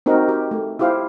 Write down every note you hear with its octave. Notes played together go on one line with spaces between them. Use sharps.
C4 D#4 F#4 A#4
G4
A3
E4 F4 G4 C5 F5